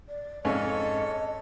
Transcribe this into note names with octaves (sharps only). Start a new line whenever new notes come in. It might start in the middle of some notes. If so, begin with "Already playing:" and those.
D5
F2 G#2 C#4 A4 C#5 D#5